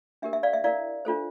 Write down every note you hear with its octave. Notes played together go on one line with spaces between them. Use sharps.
D4 G4 A#4 E5
E5
D5 F5
E5
E4 A#4 D5 F5
D4 F4 A4 C5